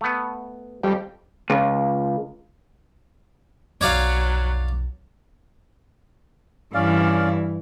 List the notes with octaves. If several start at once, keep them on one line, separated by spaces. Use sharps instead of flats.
A3 B3
F2 G3
C#2
B1 F2 F#3 C#5 D5 F5
G2 E3 C#4 D5 F5